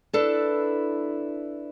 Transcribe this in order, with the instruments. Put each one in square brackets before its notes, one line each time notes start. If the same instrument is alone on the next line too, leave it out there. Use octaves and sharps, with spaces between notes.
[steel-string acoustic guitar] D4 E4 A4 B4